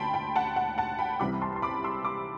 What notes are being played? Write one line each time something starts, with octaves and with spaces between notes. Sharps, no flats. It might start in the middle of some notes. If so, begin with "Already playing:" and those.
Already playing: D2 D3 G5 A5 B5 C6
G5 B5
F#5 A5
F#5
F#5 A5
G5 B5
C2 C3 E3 G3 B5 D6
A5 C6
C6
B5 D6
C6 E6
B5 D6